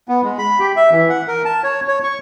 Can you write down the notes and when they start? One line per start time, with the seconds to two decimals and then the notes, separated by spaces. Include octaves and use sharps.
0.08 B3
0.24 G#3
0.38 B5
0.59 G4
0.76 E5
0.92 E3
1.10 F#5
1.28 A#4
1.45 A5
1.63 C#5
1.88 C#5
2.04 C#6